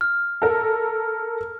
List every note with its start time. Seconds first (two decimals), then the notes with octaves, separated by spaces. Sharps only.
0.01 F6
0.42 A4 A#4